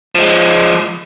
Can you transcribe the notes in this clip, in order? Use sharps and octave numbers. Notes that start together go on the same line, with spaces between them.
F3 G#3